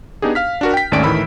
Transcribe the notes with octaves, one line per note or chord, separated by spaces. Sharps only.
B3 D4 D#4 G4 G#4
F5 F6 B6
D4 F#4 A#4
G5 B6
G#1 D#2 A3 C#4 D5 D7
A2 D#3 E3 B5 E6